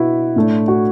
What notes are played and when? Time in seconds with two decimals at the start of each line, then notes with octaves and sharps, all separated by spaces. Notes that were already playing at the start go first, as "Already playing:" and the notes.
Already playing: B2 D4 E4 F#4 B4
0.36 A2 A3 D4
0.68 F#4